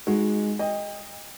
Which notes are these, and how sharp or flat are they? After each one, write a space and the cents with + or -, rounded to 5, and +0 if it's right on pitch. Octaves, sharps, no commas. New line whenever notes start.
G#3 +0 D#4 +0 F#4 -20
D#5 +0 G5 +35